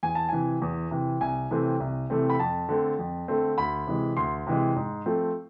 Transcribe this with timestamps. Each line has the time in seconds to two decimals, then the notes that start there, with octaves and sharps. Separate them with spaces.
0.03 E2 G#5
0.15 A5
0.29 C3 E3 G#5
0.62 E2
0.91 C3 E3
1.21 C2 G#5
1.51 C3 E3 A3 C4
1.80 C2
2.10 C3 E3 A3 C4
2.30 B5
2.39 F2 A5
2.69 D3 A3 C4
2.99 F2
3.28 D3 A3 C4
3.58 D2 B5
3.87 C3 E3 G#3
4.17 D2 C6
4.47 C3 E3 G#3
4.76 G#2
5.06 F3 A3 C4